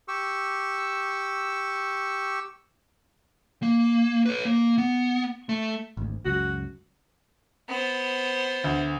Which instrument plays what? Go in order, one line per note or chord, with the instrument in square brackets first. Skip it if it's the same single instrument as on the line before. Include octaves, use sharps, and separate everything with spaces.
[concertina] G4 C#6 E6
[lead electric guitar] A#3
B4 C#5
A#3
B3
A3
[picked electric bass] G#1 D2
[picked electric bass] C#2 F#2 [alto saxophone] F#4
[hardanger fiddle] B3 C5
[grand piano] D2